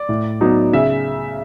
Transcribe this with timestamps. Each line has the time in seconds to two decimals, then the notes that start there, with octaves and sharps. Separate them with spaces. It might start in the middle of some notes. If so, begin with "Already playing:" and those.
Already playing: D5
0.09 A2
0.41 F#3 B3 D#4
0.73 C#3 E5